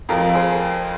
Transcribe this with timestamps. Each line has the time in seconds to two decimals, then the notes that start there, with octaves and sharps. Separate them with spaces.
0.09 F2 F3 F4 A#4
0.35 G#4 C5